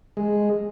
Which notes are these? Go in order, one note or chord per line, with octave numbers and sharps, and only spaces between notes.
G#3